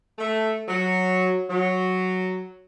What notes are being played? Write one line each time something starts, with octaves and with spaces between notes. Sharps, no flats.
A3
F#3
F#3